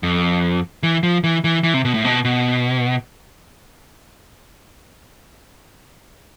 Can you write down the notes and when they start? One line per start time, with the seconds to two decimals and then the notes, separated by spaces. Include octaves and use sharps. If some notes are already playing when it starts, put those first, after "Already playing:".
0.03 F2
0.83 E3
1.03 F3
1.24 E3
1.44 E3
1.63 E3
1.74 C3
1.85 B2
1.94 A2
2.05 B2
2.25 B2